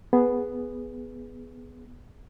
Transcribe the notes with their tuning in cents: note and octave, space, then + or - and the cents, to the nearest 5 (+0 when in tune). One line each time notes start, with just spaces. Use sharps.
B3 +0 G#4 +0